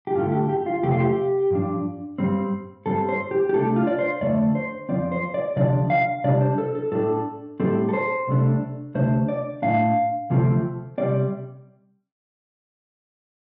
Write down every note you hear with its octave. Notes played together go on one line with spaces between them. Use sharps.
G4
G2 D3 A3 F4
G4
G4
F4
F2 C3 A3 C4 G4
F4
G4
G2 F3 D4
G2 G3 C4
G2 G3 C4 A4
C5
G4
G4
C2 C3 A3 D4 A4
F4
D5
C5
F2 D3 A3 D5
C5
F2 C3 F3 C4 D5
C5
D5
D2 C3 F3 D4 D5
F5
C3 G3 D4 D5
C5
A4
A4
A2 A3 D4 A4
A2 G3 C4 A4
A4
C5
C2 C3 A3 D4
D2 C3 A3 D4 C5
D5
A2 A3 D4 F5
D2 C3 F3 A3 C4
C3 G3 C4 D5